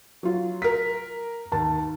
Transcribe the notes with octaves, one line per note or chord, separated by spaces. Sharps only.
F#3 F4
A#4 B6
D#2 D#3 A5